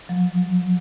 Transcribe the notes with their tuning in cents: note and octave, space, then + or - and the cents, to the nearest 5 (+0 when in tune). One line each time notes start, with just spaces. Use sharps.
F#3 -45